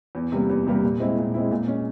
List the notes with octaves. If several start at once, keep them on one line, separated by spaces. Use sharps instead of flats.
E2
C3 G3 A#3
E2
C3 G3 A#3
A#2
G#3 C4 E4
A#2
G#3 C4 E4
A#2
G#3 C#4